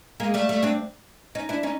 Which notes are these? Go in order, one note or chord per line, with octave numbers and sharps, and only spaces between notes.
G#3 A#3
G3 A3
G3 A3
C4 D4
C#4 D#4
D4 E4
C#4 D#4